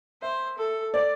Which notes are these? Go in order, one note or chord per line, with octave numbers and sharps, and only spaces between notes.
C5 E5
A4
D5